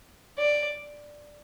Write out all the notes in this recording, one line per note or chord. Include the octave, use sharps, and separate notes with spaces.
D5